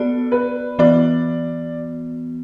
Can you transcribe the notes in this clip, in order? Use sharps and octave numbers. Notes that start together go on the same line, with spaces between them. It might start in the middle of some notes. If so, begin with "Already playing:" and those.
Already playing: B3 F#4 A4 D5
B4
E3 B3 F#4 D5